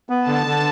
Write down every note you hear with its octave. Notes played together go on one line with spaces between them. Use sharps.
B3
D3 A5
D3